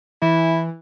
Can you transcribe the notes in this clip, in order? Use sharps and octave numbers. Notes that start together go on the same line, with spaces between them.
E3 E4